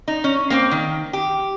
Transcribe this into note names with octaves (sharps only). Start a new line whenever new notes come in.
D#4
C#4
A#3 C4
D#3
G4